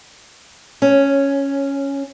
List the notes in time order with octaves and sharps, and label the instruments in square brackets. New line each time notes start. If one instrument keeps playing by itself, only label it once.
[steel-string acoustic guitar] C#4